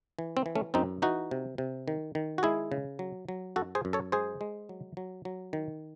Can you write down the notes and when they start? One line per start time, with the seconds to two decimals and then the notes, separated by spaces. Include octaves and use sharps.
0.19 E3
0.37 C4
0.46 E3
0.55 A3 C#4
0.74 F#2 C4 D#4
1.02 E3 D#4 F#4
1.31 C3
1.58 C3
1.88 D#3
2.15 D#3
2.38 F#4
2.43 G#3 E4 G#4
2.72 C#3
2.99 F#3
3.29 F#3
3.56 F#2 F#4 A4
3.75 G#4 C5
3.85 F#2
3.93 A4 C#5
4.12 G#3 G#4 C5
4.41 G#3
4.69 F#3
4.97 F#3
5.25 F#3
5.53 D#3